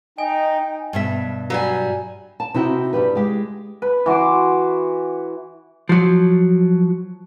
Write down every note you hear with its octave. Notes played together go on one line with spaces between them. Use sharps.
D#4 D#5 G5 G#5
G2 B2 E5
F#3 G3 G#5
A5
C3 D#4 E4 F#4 G5
G2 G3 G4 B4
G#3 G4
B4
E3 F#4 C6 D6
F3 F#3